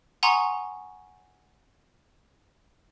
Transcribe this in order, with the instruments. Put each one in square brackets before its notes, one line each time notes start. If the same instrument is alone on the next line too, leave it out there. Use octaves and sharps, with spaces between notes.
[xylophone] F#5 G#5 A#5 C6 C#6 D#6